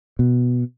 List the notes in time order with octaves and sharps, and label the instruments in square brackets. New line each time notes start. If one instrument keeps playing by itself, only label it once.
[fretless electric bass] B2